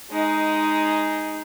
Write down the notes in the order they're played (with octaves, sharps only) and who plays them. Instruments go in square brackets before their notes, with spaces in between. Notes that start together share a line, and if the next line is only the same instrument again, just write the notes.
[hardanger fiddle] G#3 D#4